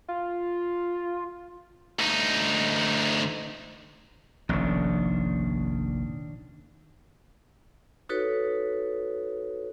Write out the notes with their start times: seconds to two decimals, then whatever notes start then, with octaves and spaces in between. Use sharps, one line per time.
0.08 F4
1.99 D2 D#4
4.49 F1 A#1 D#3 C#4 D4
8.09 D#4 F#4 A4 B4 C#5